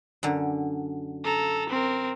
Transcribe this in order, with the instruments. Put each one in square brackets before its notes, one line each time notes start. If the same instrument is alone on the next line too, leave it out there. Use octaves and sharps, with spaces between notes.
[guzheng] F#2 D3
[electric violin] A4 A#5
C4 A#4